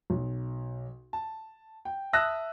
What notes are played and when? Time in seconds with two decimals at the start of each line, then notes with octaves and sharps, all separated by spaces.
0.10 B1
1.13 A5
1.85 G5
2.13 E5 A5 D#6 E6 F#6 A#6